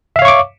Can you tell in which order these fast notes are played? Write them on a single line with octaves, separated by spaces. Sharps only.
E5 F5 C#5 C#6 D6